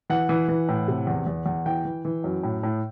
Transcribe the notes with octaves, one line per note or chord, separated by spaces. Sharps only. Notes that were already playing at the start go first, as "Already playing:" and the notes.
E3 F#5
E3
E3
A2
C3
E2
E2
E2
E3 G5
E3
E3
F#2
A2
A2